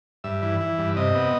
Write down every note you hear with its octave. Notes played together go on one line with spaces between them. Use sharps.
G2 E5
E3
E3
G2
C3 D#5
B3